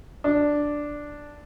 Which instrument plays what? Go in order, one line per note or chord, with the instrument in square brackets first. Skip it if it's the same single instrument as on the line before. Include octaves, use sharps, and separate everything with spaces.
[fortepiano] D4